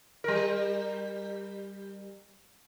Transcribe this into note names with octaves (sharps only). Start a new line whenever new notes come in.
G3 A#4